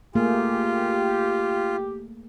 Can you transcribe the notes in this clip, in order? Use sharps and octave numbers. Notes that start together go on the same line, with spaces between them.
A3 A#3 F4 G4 G#4